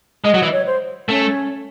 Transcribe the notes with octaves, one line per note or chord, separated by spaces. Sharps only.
G#3 D#5
F#3
E3
C#5
C5
A3 C#4